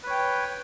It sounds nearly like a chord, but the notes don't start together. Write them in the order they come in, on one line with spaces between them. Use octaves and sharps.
B4 C#5 G5